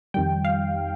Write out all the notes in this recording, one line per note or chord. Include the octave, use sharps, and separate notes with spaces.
F2 D#3 G3 G5
F5